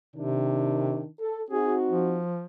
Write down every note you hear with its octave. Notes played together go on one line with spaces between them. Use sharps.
C3 D#3 D4
A4
C4 D#4 F#4 G#4
F3